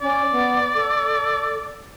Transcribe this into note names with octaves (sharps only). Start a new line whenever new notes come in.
C#4 D5
B3
A4